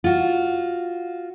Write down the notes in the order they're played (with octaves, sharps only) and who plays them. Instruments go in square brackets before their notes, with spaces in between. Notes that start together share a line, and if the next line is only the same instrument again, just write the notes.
[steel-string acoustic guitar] F4 F#4